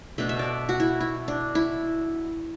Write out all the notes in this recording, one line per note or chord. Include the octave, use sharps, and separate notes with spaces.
B2 A3 D4 E5
E5
D5
F#4
E4
E4
D4
E4